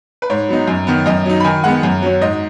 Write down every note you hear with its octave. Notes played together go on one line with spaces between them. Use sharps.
B4
G#2 C#5
F#3 B3 D#4
F#2
D#3 B3
F#2 D#5
F#3 D#4
B5
D#3 G#5
G#3 B3 F#5
F#2
F#3 C#4
G#2 D#5